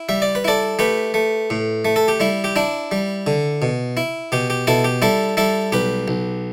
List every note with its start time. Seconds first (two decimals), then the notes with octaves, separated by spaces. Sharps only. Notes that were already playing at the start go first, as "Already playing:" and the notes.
Already playing: E4
0.09 G3 E5
0.22 D5
0.35 B4
0.44 E4 A4 D5
0.79 A3 G4 B4
1.14 A3
1.50 A2
1.85 A3
1.96 A4
2.08 G4
2.20 G3 E4
2.44 G4
2.56 D4 E4
2.92 G3
3.27 D3
3.62 B2
3.97 E4
4.32 B2 G4
4.50 G4
4.67 B2 E4 A4
4.84 G4
5.02 G3 E4 A4
5.37 G3 E4 A4
5.72 B1 G4 B4
6.08 B1